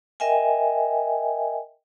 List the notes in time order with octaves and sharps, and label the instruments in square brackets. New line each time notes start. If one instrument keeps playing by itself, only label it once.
[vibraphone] A#4 D#5 E5 G5 G#5